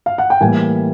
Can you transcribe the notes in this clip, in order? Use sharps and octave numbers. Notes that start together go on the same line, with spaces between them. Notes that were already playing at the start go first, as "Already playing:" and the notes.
F5
F#5
G5
A2 E3 G3 A#3 G#5